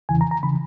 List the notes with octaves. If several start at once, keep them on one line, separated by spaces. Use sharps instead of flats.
E2 C#3 E3 G#5
A#5
A#5
C#3 E3 B5